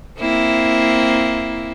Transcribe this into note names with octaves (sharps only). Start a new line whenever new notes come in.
A#3 C4 E4